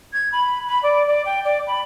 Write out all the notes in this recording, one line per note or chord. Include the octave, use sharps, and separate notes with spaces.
G#6
B5
B5
D5
D5
G5
D5
B5